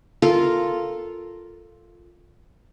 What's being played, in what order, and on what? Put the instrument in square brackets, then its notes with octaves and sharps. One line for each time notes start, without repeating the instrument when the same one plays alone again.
[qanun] F4 A4 A#4 F5